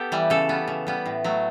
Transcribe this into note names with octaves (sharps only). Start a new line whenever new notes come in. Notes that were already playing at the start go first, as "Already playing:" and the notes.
Already playing: B3 G4 A4
E3 G3
C#3 A4
G3 B3
C#3
G3 B3
A2
F#3 A3